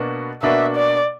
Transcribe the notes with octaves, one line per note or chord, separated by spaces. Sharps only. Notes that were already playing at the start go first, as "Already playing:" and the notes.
Already playing: B2 A#3 D4 F#4 B4
B2 A#3 D4 F#4 B4 E5
D5